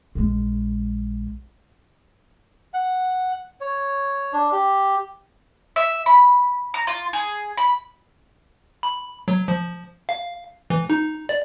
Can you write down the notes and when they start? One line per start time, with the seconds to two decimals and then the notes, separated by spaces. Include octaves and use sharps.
0.15 A#1 G#3
2.74 F#5
3.61 C#5
4.33 D4
4.52 G4
5.76 E5
6.06 B5
6.74 A#5
6.87 F4
7.13 G#4
7.58 B5
8.83 B5
9.28 F#3
9.48 F3
10.09 F5
10.70 E3
10.90 D#4
11.29 D5